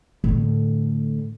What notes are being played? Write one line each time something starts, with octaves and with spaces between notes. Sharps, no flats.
A2 D3